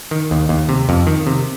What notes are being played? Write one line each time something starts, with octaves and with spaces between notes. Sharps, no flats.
D#3
D#2
D#2
C3
F2
D#3
C3